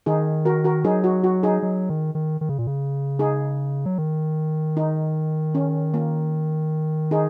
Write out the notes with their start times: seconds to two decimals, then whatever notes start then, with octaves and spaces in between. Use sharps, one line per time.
0.06 D#3 D#4 G#4
0.45 F#4 A#4
0.64 F#4 A#4
0.84 F#3 D#4 G#4
1.04 F#4
1.24 F#4
1.43 D#4 G#4
1.62 F#3
1.89 D#3
2.15 D#3
2.41 D#3
2.49 C#3
2.58 A#2
2.67 C#3
3.19 D#4 G#4
3.86 F#3
3.98 D#3
4.77 D#4
5.55 C#4
5.94 A#3
7.11 D#4 G#4